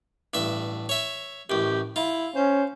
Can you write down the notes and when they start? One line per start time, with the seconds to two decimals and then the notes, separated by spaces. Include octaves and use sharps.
0.34 A1 G2 E5
0.89 C#5 E5
1.50 A1 F#2 G4
1.96 E4 F4
2.35 C#4 C5